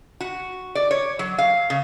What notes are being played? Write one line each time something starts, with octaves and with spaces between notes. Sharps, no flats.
F#4
D5
C#5
F#3
F5
C#3